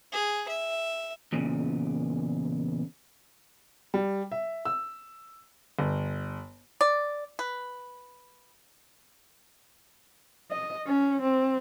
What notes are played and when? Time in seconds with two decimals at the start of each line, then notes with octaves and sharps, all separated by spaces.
0.13 G#4
0.49 E5
1.32 E2 A#2 C#3
3.94 G3
4.32 E5
4.65 E6
5.79 G1
6.81 D5
7.39 B4
10.51 D#5
10.87 C#4
11.22 C4